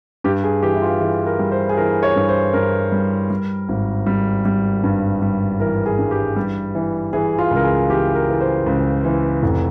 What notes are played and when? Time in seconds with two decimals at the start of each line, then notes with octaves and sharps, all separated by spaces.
0.24 G2 G4
0.44 G#4
0.62 E3 G4
0.75 E4
0.82 F4
1.00 E3 G#4
1.26 A#4
1.39 G3
1.52 C5
1.69 G#4
1.77 E3 A#4
2.03 C#5
2.16 G2
2.29 C5
2.53 G2 A#4
2.92 G3
3.30 G3
3.69 G#1
4.06 G3
4.45 G3
4.84 G2
5.22 G3
5.60 E3 A#4
5.86 G#4
5.99 G2
6.11 G4
6.36 G3
6.75 E3
7.13 E3 G#4
7.39 F4
7.51 C#2 A#4
7.64 G#4
7.90 E3 G4
8.15 A#4
8.28 E3
8.41 C5
8.66 C#2
9.04 E3
9.43 F1